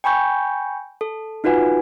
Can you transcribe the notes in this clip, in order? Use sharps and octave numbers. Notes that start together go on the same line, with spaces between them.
G5 G#5 B5 C#6 G6
A4
D#4 F4 F#4 B4 F#5 G#5